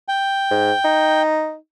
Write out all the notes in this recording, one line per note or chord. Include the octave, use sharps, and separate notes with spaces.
G5
G#2
D#4